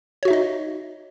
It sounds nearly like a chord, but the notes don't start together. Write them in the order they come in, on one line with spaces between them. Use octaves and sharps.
C#5 F#4 E5 D#4 D#5